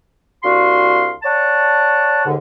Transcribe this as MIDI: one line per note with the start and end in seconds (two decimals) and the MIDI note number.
0.43 1.10 36
0.43 1.10 62
0.43 1.10 66
0.43 1.10 77
0.43 1.10 84
1.23 2.23 73
1.23 2.23 74
1.23 2.23 78
1.23 2.23 81
2.26 2.35 39
2.26 2.35 44
2.26 2.35 50